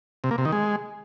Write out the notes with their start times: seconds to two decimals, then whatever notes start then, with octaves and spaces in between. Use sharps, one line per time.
0.24 C3
0.31 A#3
0.38 C3
0.45 D#3
0.52 G#3